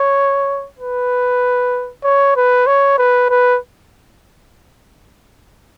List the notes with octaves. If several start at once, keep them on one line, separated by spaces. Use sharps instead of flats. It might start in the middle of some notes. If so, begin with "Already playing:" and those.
Already playing: C#5
B4
C#5
B4
C#5
B4
B4